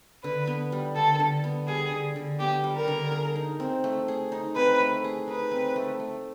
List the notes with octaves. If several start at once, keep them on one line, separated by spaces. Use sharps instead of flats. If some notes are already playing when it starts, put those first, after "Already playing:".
D3 B4
B3
G3
D3 A4
D3
B3
G3 G#4
D3
D3
B3 G4
G3
A#4
D3
G#4
D#4
C4
A3
G#4
D#4
C4 B4
A3
G#4
D#4 B4
C4
A3
A3